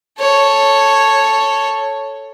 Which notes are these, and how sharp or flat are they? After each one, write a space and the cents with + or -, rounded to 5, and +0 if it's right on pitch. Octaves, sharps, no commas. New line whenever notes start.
A4 +0 C#5 +0